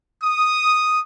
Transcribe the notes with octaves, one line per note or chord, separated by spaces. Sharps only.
D#6